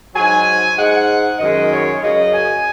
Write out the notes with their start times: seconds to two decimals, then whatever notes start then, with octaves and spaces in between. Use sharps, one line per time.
0.15 G#2 F#3 G#5
0.78 G#2 G#3 F#5
1.39 F#2 D#3 G#3 D#5
1.71 C#5
2.02 F#2 C#3 F#3 D#5
2.33 G#5